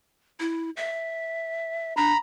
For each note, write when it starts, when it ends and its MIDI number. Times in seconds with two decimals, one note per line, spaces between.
0.40 0.70 64
0.77 1.93 76
1.97 2.13 62
1.97 2.17 82
1.97 2.17 83